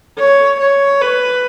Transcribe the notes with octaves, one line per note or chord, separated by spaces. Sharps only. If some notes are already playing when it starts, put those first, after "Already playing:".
C#5
C#5
B4